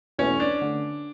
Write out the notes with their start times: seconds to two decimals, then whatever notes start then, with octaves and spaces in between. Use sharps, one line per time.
0.18 E2 B2 A3 C#4 E4 B4
0.40 D4
0.61 D3 A3 C#4